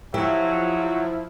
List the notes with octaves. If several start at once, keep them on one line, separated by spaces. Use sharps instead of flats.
F3 F#3 E4 G4 E5